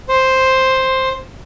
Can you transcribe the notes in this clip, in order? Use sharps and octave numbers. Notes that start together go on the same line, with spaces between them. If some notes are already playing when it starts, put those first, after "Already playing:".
C5